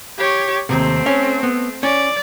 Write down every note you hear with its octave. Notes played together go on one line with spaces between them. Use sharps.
G4 C#5
D#2 A2 C3 A3 C4
C#4
B3
C#4 D5